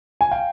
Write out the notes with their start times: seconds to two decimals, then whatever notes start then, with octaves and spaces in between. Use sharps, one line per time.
0.21 G#5
0.31 F5 G5